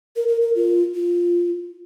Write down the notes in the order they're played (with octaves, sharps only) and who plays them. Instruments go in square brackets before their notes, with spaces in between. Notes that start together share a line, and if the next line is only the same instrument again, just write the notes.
[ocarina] A#4
A#4
A#4
F4
F4